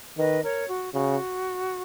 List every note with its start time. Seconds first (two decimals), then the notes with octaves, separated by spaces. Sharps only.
0.17 D#3 B4 D#5
0.42 A#4 C#5
0.68 F#4
0.93 C#3 F#4